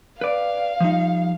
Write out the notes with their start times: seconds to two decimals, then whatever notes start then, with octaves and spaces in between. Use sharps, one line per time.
0.21 B4 D5 F5
0.80 F3 G3 D#4